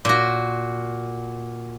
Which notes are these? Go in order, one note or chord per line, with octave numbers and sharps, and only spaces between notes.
A#2 F#4